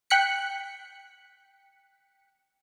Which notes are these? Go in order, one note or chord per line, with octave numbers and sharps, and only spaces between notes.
G5 F#6 B6 C#7